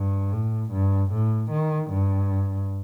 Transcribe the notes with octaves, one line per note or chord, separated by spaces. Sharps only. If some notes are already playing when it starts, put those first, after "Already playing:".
Already playing: G2
A2
G2
A2
D#3
G2